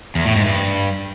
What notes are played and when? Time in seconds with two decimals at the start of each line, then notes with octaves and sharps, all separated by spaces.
0.15 E2
0.25 A2
0.36 G#2
0.46 G2